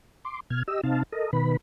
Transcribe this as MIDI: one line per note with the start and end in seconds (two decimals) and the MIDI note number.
0.25 0.40 84
0.25 0.40 86
0.50 0.63 47
0.50 0.63 89
0.50 0.63 92
0.68 0.81 67
0.68 0.81 75
0.68 0.81 88
0.84 1.03 48
0.84 1.03 60
0.84 1.03 63
0.84 1.03 77
0.84 1.03 81
1.12 1.31 69
1.12 1.31 70
1.12 1.31 75
1.33 1.57 47
1.33 1.57 51
1.33 1.57 71
1.33 1.57 83